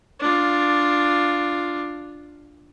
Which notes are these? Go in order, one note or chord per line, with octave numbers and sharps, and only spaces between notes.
D4 F4